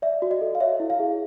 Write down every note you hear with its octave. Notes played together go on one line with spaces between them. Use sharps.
D5 E5
F#4
D#5
A4
F5
C#5 E5
E4
F5
G#4